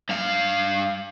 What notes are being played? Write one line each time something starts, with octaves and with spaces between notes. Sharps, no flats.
G2 F5